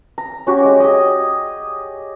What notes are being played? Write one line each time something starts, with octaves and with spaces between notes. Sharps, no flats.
A#5
C#4 F#4 G4
G#3 D6
G4 G#4 D#5